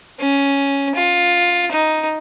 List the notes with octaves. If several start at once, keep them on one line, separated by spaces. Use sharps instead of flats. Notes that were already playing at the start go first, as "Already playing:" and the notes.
C#4
F4
D#4